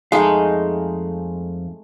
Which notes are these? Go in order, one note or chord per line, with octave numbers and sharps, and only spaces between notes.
F2 G#3 A3 D#4 F5